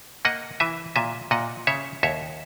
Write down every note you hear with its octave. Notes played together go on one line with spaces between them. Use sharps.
A#3 D#5 F#5
E3 E5 G#5
A#2 E5 G#5
A#2 D#5 F#5
C#3 C#5 E5
D#2 C#5 E5